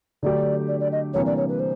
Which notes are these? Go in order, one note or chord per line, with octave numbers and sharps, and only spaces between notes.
D3 F#3 A3 D4 G4 D5
D5
D5
D#5
C3 E3 G3 A#3 D4 C#5
D5
C#5
B4
C5